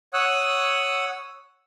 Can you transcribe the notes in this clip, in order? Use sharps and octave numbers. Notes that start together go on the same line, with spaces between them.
C#5 F#5 D#6 E6 F#6